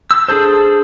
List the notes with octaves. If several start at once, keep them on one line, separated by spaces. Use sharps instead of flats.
E6
D4 G#4 A4 C5